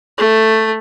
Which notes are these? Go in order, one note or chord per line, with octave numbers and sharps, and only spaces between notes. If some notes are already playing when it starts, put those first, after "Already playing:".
A3